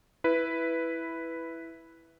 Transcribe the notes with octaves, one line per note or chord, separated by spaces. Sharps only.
E4 B4